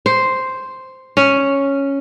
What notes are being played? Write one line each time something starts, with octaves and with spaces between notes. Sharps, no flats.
C5
C#4